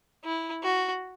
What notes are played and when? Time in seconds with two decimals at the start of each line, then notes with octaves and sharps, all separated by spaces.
0.24 E4
0.63 F#4